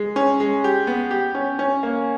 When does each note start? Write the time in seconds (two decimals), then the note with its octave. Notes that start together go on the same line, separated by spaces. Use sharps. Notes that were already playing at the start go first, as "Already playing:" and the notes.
Already playing: G#3
0.16 C#4
0.40 G#3
0.64 G4
0.87 B3
1.11 G4
1.35 C#4
1.59 C#4
1.83 A#3